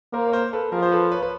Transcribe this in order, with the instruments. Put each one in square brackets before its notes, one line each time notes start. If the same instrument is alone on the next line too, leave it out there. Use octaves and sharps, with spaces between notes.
[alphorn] A#3 [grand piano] A#4 C5
[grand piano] C#5
A#4 C5
A4 B4
[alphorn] F3 [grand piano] G#4 A#4
[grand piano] C5
A4 B4
B4 C#5
B4